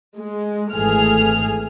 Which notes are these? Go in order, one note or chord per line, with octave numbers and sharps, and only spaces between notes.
G#3
G#1 E3 A3 G#4 F6